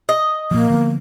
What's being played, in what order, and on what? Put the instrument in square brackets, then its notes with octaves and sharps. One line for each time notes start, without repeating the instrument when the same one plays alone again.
[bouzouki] D#5
[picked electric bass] A#2 F3 [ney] A#3
[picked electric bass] D3 F3 B3